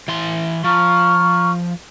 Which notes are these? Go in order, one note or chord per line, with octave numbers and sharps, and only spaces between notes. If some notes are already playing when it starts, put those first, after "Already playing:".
E3 C6
F3 A#5 C#6 F6